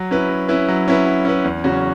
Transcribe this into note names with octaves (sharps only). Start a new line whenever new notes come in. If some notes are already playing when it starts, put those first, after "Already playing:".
Already playing: F#3
C#4 E4 B4
F#3
C#4 E4 B4
F#3
C#4 E4 B4
F#3
C#4 E4 B4
E2
C#3 F#3 C#4 F#4